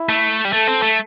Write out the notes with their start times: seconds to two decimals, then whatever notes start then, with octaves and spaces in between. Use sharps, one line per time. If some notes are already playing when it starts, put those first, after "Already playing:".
Already playing: E4
0.09 A3
0.45 G3
0.53 A3 A4
0.67 C4
0.82 A3